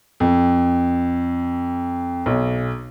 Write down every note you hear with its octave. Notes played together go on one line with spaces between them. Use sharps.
F2
B1